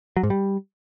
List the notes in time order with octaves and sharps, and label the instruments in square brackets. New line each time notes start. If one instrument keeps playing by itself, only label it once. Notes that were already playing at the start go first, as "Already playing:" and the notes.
[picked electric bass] F#3
G#2
G3